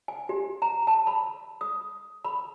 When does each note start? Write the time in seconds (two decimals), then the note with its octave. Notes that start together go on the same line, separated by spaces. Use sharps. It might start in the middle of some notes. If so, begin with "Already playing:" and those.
0.08 G#5
0.29 G4
0.62 A#5
0.87 A5
1.07 B5
1.61 D#6
2.24 B5